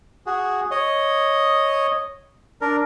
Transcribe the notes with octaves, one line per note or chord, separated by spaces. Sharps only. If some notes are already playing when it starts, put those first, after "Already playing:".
F#4 G#4
C#5 D#5
D4 A#4